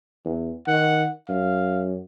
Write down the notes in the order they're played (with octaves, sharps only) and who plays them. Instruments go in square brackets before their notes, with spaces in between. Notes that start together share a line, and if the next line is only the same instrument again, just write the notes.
[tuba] E2
[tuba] D#3 [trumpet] F#5
[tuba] F#2 [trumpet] F5